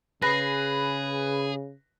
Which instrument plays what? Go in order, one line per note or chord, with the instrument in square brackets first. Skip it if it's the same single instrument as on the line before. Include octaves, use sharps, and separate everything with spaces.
[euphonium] C#3 [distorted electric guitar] G#4 [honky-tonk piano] B4 [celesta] A#6 C7